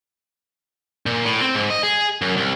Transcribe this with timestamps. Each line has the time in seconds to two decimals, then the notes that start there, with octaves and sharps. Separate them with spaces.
1.06 A#2
1.25 A2
1.41 C4
1.55 G#2
1.70 D#5
1.83 G#4
2.22 F#2
2.37 C2